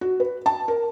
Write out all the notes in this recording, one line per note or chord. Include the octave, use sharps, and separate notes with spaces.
F#4
B4
A5
A#4